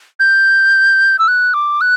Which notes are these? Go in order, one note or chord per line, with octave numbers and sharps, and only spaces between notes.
G6
E6
F#6
D6
F#6